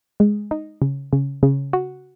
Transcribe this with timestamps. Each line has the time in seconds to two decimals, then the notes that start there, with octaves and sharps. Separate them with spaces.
0.20 G#3
0.51 D#4
0.82 C#3
1.13 C#3
1.43 C#3
1.73 F#4